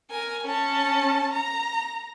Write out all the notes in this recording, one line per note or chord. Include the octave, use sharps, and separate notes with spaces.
A#4 G#5
C#4 A5
A#5